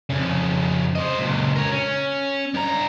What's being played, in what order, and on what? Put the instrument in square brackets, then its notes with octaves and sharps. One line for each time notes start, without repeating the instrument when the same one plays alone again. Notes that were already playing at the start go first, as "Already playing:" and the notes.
[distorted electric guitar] F2 C#3
C5 D#5
C#2 A#2
A#4 C#5
C#4
G2 A#5